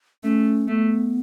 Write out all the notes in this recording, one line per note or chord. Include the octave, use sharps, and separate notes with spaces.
A3 C#4
A3 B3